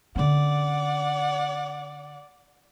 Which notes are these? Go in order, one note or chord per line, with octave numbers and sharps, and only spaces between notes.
D3 C#4 D5 F#5